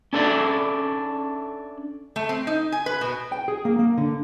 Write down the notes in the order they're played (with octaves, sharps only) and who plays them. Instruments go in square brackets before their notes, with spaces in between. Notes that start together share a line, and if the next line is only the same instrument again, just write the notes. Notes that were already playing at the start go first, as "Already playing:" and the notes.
[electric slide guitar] C#4 D4 A4 C5 D5 E5
[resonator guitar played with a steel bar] A3
C4
D#4
G#5
B4
B2
[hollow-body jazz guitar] G5
G#4
A#3
A#3
D3